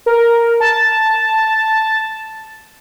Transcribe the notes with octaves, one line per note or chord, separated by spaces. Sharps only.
A#4
A5